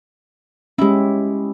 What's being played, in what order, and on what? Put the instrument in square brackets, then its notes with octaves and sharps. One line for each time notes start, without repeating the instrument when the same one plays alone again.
[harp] G#3 E4 [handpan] C#4 G4